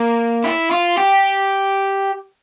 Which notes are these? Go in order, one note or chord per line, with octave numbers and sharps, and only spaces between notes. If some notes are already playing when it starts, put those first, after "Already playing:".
Already playing: A#3
E4
F4
G4